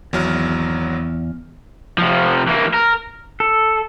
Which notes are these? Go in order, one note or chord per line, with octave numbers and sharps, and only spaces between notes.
G#1 E2 F#3 F6
C3 F3
E3 A#3
A#4
A4